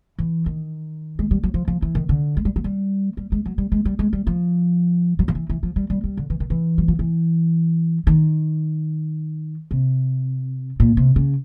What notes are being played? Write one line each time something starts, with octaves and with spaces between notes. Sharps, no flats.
E3
D#3
G#3
G3
F#3
F3
F3
E3
D#3
D3
G#3
G3
F#3
G3
G3
G#3
F#3
G3
G#3
G3
G#3
G3
F3
F#3
F3
E3
E3
F3
G3
G3
G3
D3
E3
D#3
E3
F#3
F3
E3
D#3
C3
A#2
C3
C#3